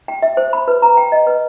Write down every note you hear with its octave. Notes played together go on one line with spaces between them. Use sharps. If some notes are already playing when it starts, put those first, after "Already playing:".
G5
E5
C5
B5
B4
A#5
G5
D#5
B4